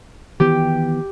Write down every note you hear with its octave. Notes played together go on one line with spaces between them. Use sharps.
D#3 E3 B3 G4